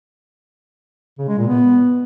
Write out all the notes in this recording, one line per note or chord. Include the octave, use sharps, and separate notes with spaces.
C#3
G#3
A#2
B3